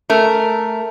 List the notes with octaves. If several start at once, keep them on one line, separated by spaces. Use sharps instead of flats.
A3 A#4